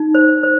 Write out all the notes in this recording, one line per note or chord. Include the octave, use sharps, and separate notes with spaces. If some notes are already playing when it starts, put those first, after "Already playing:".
Already playing: D#4
C5
C5